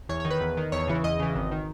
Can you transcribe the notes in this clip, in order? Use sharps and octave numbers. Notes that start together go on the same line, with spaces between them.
E2 C#5
C#5
D#3
B4
E2
D#3
E2 C#5
C#3 E3
E2 D#5
C#3 E3
G#1
D#3